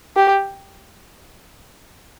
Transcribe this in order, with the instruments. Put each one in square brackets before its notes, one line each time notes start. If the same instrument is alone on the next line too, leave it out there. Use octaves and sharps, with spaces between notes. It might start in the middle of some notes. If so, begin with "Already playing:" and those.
[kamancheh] G4